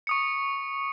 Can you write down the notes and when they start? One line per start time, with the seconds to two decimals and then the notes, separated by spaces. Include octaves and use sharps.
0.07 C#6 D#6 C#7